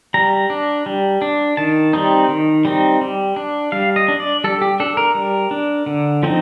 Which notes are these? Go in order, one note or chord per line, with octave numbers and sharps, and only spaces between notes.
G3 A#5
D4
G3
D4
D#3 A5
G3 C4 D#4
D#3
G3 C4 D#4
G3
D4
G3 F5
D#5
D4
D5
G3 A4
G4
D4 A4
A#4
G3
D4
D3
F3 C4 D#4